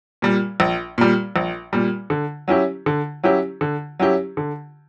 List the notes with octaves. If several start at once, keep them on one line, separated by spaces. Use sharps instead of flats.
A#2 G3
A#1
A#2 G3
A#1
A#2 G3
D3
F#3 C#4 E4 G4
D3
F#3 C#4 E4 G4
D3
F#3 C#4 E4 G4
D3